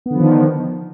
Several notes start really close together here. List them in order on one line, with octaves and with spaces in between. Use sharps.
B3 D3 F3 D#3